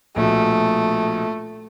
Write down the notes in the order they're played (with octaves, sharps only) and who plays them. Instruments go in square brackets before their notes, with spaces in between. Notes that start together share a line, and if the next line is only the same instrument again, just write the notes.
[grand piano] A#1 B2 [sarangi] A3